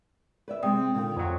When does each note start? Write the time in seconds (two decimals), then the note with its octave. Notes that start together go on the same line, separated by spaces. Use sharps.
0.48 B4 D5 E5
0.63 C3 G#3 C4 G5 D#6
0.95 A#2 D3 D#3
1.17 F2 F#3 C5 G#5